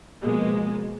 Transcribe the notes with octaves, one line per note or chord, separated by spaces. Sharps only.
B2 F3 G#3 A#3